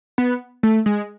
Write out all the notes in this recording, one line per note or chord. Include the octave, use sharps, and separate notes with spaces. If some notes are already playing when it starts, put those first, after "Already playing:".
B3
A3
G#3